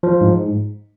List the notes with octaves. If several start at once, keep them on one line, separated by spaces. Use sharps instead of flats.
F3
G#2